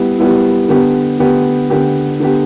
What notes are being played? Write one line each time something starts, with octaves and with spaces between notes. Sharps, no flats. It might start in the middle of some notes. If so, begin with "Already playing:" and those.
Already playing: G3 B3 E4
G3 B3 E4
D3 B3 G4
D3 B3 G4
D3 B3 G4
D3 B3 G4